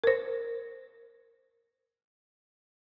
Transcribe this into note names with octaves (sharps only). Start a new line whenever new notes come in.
A#4 C5